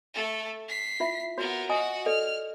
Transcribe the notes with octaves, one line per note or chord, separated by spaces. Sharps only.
A3 A4
B6 C7
E4 F4 E5
B3 F#4 A#4 C#5
F#4 D#5 F#5 G#5 D#6
A4 D5 D#5 F6